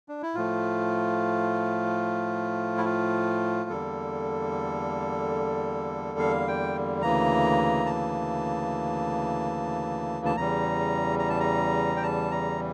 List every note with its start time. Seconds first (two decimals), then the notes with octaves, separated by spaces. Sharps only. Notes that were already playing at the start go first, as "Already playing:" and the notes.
0.09 D4
0.22 E4
0.35 A2 F3 A3 F4
2.78 E4
2.85 F4
3.69 E2 D3 G3 A#3 A4
6.19 F5
6.48 G5
7.02 D2 C#3 E3 A#3 A#5
7.86 A5
10.26 A5
10.36 E2 C#3 E3 G3 A#5
11.19 A#5
11.30 A5
11.40 A#5
11.96 G5
12.03 A5
12.31 A#5